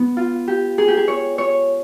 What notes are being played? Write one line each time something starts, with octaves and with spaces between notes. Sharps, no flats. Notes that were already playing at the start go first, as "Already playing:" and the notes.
Already playing: B3
F4
G4
G#4
G4
G#4
C#5
C#5